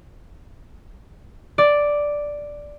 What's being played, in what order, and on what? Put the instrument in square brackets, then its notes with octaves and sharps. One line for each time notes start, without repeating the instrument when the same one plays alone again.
[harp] D5